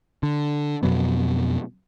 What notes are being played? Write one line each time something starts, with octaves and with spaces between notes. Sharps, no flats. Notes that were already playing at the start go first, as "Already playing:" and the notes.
D3
F2 B2 F#3 B3